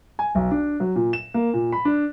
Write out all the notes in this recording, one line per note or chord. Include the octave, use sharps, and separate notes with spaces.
G#5
B1
D4
F#3
A#2
E7
A#3
A#2
B5
D4